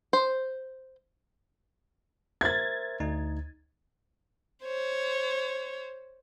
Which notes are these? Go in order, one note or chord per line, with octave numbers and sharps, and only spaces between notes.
C5
A#4 C5 E5 G#6 A6
D2 D#4
C5 C#5